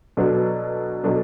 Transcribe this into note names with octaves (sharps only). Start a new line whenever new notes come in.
B2 F#3 B3 D4 A4
B2 F#3 B3 D4 A4